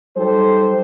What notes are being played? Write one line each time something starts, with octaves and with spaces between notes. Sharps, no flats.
F#3 G3 D#4 G4 A4 C5